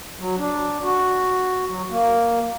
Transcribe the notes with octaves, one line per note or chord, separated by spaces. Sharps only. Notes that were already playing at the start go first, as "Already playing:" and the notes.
F#3
D4
F#4
F#3
A#3